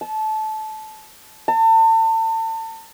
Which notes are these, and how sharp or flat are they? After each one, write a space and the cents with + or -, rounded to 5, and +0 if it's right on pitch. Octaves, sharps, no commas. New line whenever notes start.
A5 -20
A5 +35